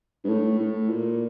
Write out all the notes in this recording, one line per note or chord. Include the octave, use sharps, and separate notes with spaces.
G2
A2
A2
A#2